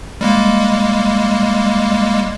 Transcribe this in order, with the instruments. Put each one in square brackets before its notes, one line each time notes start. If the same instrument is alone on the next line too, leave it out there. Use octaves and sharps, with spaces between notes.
[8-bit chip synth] G3 G#3 A#3